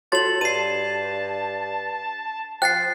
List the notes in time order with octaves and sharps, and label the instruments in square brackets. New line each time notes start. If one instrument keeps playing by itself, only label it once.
[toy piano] F#4 C#5 C6 [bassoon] A4 [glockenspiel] A6 F#7
[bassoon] G2 [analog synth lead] A5 [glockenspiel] C7 D#7
[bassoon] F3 [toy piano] G5 [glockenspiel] F#6 A6 C7